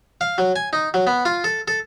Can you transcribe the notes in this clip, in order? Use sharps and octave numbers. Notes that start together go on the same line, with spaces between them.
F5
F#3
G#5
D#4
F#3
B3
F4
A4
A4